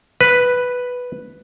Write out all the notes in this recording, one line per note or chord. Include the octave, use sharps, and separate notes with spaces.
B4